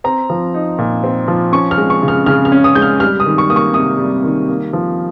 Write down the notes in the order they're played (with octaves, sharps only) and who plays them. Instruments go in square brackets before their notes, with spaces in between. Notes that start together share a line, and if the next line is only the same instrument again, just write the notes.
[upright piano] C4 A#5
F3
D#4
A#2
C4
F3
C#4 C#6
F6
G#3
C#6
C#3
F6
C#3 F6
F6
C#4
D#6
G#3 G6
F6
G3 F6
D#6
D#3
C#6
A#3 D#6
C#6
C3 D#6
G3
D#3
A#3
F3